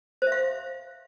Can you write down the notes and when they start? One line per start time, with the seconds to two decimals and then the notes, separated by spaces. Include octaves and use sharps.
0.22 C5
0.27 E5
0.32 F5